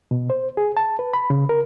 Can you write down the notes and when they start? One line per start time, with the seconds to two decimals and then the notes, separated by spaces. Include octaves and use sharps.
0.11 B2
0.30 C5
0.57 G#4
0.77 A5
0.99 B4
1.14 B5
1.30 C#3
1.49 A#4